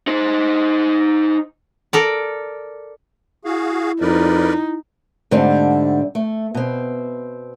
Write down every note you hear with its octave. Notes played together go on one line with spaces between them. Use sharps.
D#4 C5
A4 A#4 D5
E4 F#4 G#4 F5
F2 D#4 A#4 B4 D5
G#2 D3 G3 A3 C4 D4
A3
B2 C4